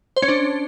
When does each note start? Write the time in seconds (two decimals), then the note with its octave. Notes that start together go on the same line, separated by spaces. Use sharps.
0.16 C5
0.22 C#4
0.28 D4